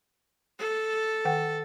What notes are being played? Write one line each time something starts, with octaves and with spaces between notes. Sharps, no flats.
A4
D#3 F#5 G5